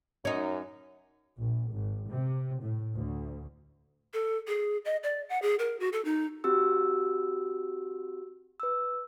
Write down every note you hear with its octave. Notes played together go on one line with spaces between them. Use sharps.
F#2 C#4 D#4
A#1
G#1
C3
A2
D2
A4
G#4
D#5
D5
F#5
G#4
A#4
F#4
A4
D#4
C4 F#4 G4 E6
B4 E6